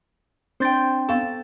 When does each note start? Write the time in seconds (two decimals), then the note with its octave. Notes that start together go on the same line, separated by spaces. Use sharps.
0.60 C4 D4 C5 G5 A6
1.09 B3 A4 F5 C#6